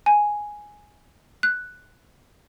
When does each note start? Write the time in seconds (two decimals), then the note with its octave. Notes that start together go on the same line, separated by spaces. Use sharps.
0.06 G#5
1.43 F#6